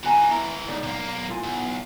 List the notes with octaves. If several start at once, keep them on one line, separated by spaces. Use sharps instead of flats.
E3 D#4 F#4 G#5 A#5
E4 E5 A#5
C#2 D#4 D5
B1 A#3
E4 F4 G#5
B1